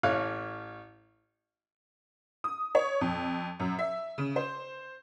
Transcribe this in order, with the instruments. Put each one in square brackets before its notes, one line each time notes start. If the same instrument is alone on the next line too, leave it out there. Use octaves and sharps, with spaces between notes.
[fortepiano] A1 A3 C#5 F5 F#6
[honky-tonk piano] D#6
C#5
F2
F#2
E5
C#3
C5